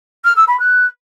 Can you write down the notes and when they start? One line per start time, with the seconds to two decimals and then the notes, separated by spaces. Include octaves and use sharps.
0.24 F6
0.36 E6
0.47 B5
0.59 F#6